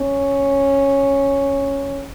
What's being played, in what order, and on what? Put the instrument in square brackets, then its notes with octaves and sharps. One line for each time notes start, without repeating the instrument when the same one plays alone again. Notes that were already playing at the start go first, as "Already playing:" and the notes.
Already playing: [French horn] C#4